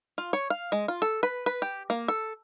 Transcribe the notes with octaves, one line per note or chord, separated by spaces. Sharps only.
F4
C#5
F5
G#3
F4
A4
B4
B4
G4
A#3
A4